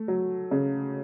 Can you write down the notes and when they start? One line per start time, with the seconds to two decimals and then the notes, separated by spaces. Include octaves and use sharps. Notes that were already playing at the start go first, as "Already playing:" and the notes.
Already playing: A3
0.08 F#3
0.51 C#3